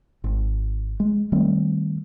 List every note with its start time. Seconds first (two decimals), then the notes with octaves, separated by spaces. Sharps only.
0.24 G#1
1.00 G#3
1.32 D#3 G3 A3 C4